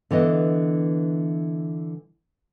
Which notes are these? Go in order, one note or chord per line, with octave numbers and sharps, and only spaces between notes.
D3 E3 B3 D#5